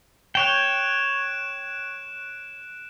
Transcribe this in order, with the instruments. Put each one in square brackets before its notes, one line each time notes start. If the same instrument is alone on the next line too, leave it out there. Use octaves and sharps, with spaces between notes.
[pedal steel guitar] C#5 G5 [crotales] F#6 D7 E7